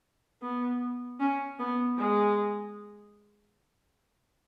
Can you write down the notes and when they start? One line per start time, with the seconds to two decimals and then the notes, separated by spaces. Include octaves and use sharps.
0.42 B3
1.20 C#4
1.59 B3
1.98 G#3